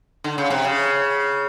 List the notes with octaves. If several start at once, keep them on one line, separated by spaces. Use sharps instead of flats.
D3
C#3
C3
C#3